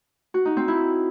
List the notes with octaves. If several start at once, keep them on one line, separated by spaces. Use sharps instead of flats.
F#4
D#4
C4
E4